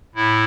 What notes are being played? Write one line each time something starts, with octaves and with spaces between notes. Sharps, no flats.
A2 E4